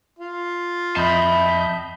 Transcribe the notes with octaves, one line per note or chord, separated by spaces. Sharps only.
F4
F2 D#5 E5 A5 B5 G6